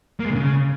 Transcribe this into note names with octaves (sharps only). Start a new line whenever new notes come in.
A#3
G#3
D3
C#3